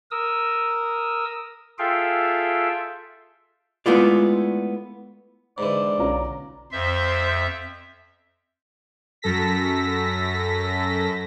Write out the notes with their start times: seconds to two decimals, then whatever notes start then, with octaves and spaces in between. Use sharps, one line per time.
0.11 A#4 D#6 E6
1.79 F4 G#4 A4 E5 F5 G5
3.86 G#3 A3 B3 E4 F4 D5
5.58 G#2 D3 E3 D5
5.98 B1 C#4 F4 A#5
6.72 F2 C5 E5
9.22 F#2 A4 A#6 B6